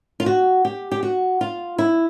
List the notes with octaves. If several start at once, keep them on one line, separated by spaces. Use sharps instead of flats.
F4
F#4
G4
G4
F#4
F4
E4